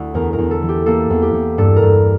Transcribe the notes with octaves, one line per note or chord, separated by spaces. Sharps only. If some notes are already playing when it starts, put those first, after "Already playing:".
Already playing: D2 E4
E2 A#4
A#4
E2
A4
E3
G4
A#3 A4
E2
G4
E2
G2 A4
A#4
G2